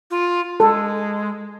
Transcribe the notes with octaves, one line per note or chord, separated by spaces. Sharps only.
F4
G#3 A4